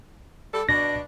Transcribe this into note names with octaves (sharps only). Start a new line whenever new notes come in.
G3 A4
B2 D4 A#6